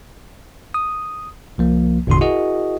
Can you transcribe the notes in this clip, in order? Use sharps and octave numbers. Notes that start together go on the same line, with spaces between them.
D#6
C2 F3 A#3
G#1 E2 A#2 D3 F#4 C6
E4 F#4 G#4 A#4 D#5